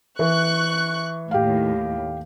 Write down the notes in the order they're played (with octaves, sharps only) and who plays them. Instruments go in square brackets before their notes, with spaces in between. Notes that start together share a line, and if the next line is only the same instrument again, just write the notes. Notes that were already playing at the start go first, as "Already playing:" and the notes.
[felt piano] E3 [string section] C#6 F#6
[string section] D#2 A2 [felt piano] G4 F5